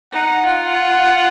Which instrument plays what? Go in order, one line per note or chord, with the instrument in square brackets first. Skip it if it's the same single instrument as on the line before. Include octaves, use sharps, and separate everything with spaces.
[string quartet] D#4 [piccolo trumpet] F#5
[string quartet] F4 [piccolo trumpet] F#5